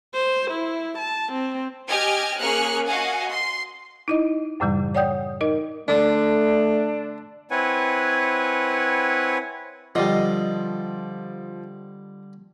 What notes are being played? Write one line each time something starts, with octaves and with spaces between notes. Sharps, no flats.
C5
E4
A5
C4
G4 D#5 G5 G#5 F6 G#6
A#3 C#4 G#4 C#6 F6 F#6
F#4 D#5 F5 F#5 G#5
C6
D#4 E4 D#5
F#2 A2 C#3 E3 G3
C#5 D5 F#5 G5 D#6 G6
D#4 A#4 D#5
D3 A3 D4
C4 E4 B4 C#5 F#5 G#5
D3 F3 G3 F4 D#5